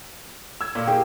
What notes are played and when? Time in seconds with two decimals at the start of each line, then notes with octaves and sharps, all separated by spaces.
0.61 E6 G#6
0.75 A#2
0.87 A#3 G4 G#4